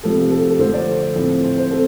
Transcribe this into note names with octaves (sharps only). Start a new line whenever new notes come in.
C3 F3 A3 A4
G4
A4
G4
A4
D3 F3 A3 C5
D5
A2 F3 A3 C4
C5
C5
C4 A4